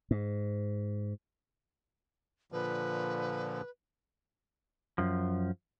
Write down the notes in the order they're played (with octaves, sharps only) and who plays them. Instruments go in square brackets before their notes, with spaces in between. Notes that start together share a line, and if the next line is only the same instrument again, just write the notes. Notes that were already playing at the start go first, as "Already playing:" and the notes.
[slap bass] G#2
[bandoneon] A#2 D3 F3 [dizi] B4
[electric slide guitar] F#2 F3